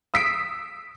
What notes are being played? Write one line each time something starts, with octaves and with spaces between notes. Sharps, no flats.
D#6 E6 B6 C7 D7